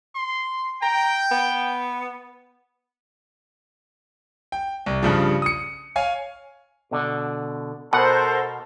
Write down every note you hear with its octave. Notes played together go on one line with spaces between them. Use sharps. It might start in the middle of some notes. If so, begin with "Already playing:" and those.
C6
G5 A#5
B3
G5
C2
G2 C#3 F3
D#6 C#7
C#5 F5 G#5
B2 D3
B2 A4 A#4 C5 F#5